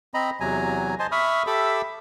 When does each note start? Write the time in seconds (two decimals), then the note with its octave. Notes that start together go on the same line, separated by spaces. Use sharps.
0.14 C4 D#5 A#5 B5
0.41 E2 C3 F#3 G#5 A#5
0.99 C5 D#5 G#5 A5 C6
1.12 E5 B5 C#6 D#6 F6
1.47 G4 A4 E5 B5 D6 E6